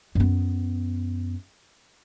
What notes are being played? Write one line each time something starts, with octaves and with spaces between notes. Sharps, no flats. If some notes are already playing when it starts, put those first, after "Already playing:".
F#2 B3